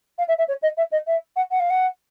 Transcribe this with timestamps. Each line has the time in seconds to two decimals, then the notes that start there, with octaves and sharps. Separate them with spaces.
0.18 F5
0.28 E5
0.38 E5
0.48 C#5
0.62 D#5
0.77 E5
0.92 D#5
1.07 E5
1.36 F#5
1.51 F#5
1.60 F5
1.70 F#5